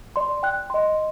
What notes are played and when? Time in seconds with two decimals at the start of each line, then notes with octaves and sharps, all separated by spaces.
0.16 D5 C6
0.43 G5 F#6
0.70 D#5 C6